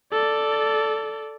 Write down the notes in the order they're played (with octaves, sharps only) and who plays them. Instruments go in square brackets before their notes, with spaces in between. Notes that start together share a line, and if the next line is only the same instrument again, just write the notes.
[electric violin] A4 D5